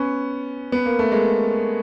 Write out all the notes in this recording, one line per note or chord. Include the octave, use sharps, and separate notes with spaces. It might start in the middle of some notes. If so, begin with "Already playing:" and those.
Already playing: B3 C#4
B3
A#3
A3
G#3 A#3